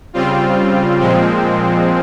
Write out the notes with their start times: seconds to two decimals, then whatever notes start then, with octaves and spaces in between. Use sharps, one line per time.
0.13 C#3 G3 C4 F4
1.00 A#2 F3 G#3 C4